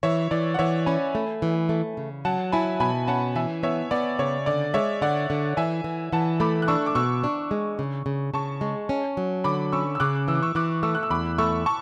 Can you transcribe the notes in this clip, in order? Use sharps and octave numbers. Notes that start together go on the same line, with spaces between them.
E3 C#5 E5
E3 D5
F#5
E3 C#5 E5
C#4 G#5 B5
A3
E3
A3
C#3
F#3 F#5 A5
E4 G#5 B5
B2 G#5 B5
C#4 F#5 A5
E3 E5 G#5
B3 C#5 E5
B3 D5
C#3 C#5
D3 D5
G#3 C#5 E5
D3 D5 F#5
D3
E3 E5 G#5
E3
E3 F#5 A5
A3 B5 D6
F#6
D4 C#6 E6
D6
B2 C#6 E6
D4
G#3
C#3
C#3
C#3 A5 C#6
G#3
C#4
F#3
D3 B5 D6
C#4 C#6 E6
E6
C#3 D6 F#6
E3 E6
D6
C#6 E6
E3 D6 F#6
A3 C#6 E6
F#6
E6
E2 B5 D6
A3 C#6 E6
A5 C#6